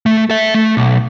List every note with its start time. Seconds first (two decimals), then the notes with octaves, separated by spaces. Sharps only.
0.06 A3
0.30 A4 E5
0.54 A3
0.77 B1